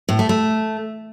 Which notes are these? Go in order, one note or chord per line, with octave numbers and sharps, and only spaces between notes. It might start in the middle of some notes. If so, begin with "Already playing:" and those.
A2
A3
A3